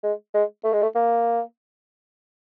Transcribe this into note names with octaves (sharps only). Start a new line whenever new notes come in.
G#3
G#3
A3
G#3
A3
A#3